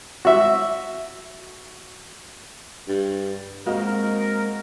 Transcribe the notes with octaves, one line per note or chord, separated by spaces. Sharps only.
F#4 E5
G2
G#3 A#3 C4 F#4 A#4 D#5 F5